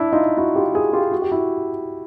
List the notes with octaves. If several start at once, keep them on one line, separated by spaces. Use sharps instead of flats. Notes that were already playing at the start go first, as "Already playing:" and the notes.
Already playing: D4 E4
D#4 F4
E4 F#4
F4 G4
F#4 G#4
F4 G4
F#4
G4
E4 F#4